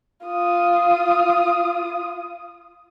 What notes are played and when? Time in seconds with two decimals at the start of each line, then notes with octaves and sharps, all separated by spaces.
0.26 F4 D#6